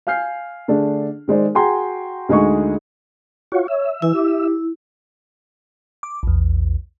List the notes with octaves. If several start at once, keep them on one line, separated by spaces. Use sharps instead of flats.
F5 G#5 F6 G6 C7
D3 A3 D4 G#4
D#3 G#3 C5 D5
F#4 G#4 G5 G#5 A#5 C6
D2 G#3 D#4 G#4 C#6
F4 F#4 C#5
C#5 E5
E3 E4
G4
D6
A#1 E2